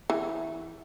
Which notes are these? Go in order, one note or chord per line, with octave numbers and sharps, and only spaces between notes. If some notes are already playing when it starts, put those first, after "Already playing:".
E3